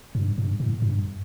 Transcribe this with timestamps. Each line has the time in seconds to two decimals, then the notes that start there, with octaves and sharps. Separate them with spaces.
0.15 G2
0.38 G2
0.60 A2
0.82 G2